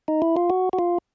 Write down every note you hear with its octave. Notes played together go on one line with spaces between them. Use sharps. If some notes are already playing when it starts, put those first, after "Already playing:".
D#4
E4
F4
F#4
F#4
F4